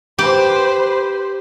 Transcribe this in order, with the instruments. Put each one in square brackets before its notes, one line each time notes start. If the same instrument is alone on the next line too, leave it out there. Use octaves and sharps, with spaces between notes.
[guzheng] G4 [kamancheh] B4 C5